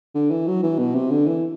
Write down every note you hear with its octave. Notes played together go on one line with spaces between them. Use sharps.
D3
E3
F#3
E3
B2
C3
D3
E3